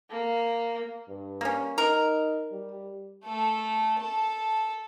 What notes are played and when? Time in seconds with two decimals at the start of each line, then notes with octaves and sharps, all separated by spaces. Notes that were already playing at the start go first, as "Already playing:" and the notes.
0.11 A#3
1.09 G2
1.41 A#3 C#4
1.78 D#4 A#4
2.52 G3
3.25 A3 A4
3.99 A4 A5